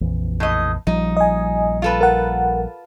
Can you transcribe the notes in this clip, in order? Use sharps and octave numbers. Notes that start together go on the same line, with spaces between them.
A#1 F2 E3
A2 D#5
A#1 F3 G3 D#4
D#5 G#5
F4 A4 B4
A#4 F#5